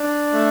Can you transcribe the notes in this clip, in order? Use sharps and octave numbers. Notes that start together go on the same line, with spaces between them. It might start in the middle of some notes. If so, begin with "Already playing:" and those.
Already playing: D4
A3